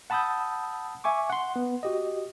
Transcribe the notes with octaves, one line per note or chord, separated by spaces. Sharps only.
F#5 A5 B5 D#6 E6 G6
E5 G#5 C#6 D6
F#5 C6
B3
F#4 G4 D#5